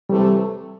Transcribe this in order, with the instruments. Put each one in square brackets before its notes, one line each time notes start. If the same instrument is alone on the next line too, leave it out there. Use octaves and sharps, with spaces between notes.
[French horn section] C3 E3 A3 [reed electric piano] G3